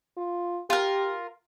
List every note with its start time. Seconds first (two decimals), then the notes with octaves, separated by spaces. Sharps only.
0.17 F4
0.70 F4 G4 A#4